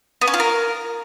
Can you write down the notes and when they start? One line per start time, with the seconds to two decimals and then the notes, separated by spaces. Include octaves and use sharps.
0.21 B3
0.28 C#4
0.34 F4
0.40 A#4